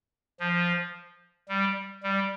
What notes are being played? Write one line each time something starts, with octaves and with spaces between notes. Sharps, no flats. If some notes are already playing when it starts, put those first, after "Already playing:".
F3
G3
G3